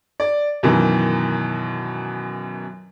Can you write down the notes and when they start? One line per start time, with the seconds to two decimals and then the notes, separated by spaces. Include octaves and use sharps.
0.20 D5
0.63 F#2 B2 D#3 E3